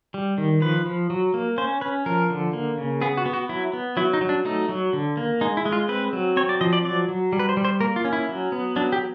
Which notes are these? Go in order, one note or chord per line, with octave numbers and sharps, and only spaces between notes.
G3
D#3
F3 B4
F3
F#3
A#3
C#4 C5
C#4 B4
F3 A#4
D3
A#3
C#3
B3 G#4
F#4
B3
F#4
F#3 E4
B3
F#3 E4
D#4
F#3
D4
A3 D#4
F#3
D3
A#3
G#3 D#4
E4
G#3
F4
C4 B4
F#3
C4 C#5
D5
F3 D#5
D5
F#3 D5
F#3
G3
B4
C5
G3
C5
A#3 A#4
F4
C#4
E4
F#3
B3
F#3 D4
G4